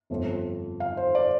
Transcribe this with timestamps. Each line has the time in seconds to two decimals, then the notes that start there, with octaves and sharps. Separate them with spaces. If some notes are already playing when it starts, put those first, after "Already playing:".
0.10 G1 F2 F3
0.80 F5
0.97 C5
1.15 D5